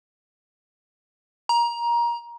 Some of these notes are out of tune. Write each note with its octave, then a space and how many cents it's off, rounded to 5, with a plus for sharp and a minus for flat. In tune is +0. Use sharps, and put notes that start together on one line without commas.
A#5 +20